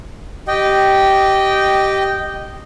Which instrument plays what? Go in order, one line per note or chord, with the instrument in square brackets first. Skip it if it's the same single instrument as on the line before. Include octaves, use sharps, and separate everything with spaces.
[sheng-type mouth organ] G4 D#5 G5